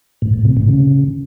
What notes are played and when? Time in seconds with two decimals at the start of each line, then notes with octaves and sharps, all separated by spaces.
0.22 A2
0.34 A2
0.45 C3
0.57 A2
0.68 C#3